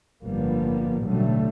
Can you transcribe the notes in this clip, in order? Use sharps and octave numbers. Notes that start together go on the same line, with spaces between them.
G1 A2 F3 G3 A#3 B3
A1 B2 D3 F#3 G3 A3